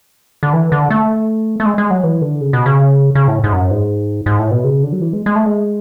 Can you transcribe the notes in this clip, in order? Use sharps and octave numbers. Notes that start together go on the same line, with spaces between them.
D3
E3
D3
A3
A3
G#3
G#3
F#3
E3
D3
C#3
B2
C#3
C#3
A2
G#2
F#2
G#2
G#2
A2
B2
C#3
D3
F#3
E3
G#3
G#3
A3
G#3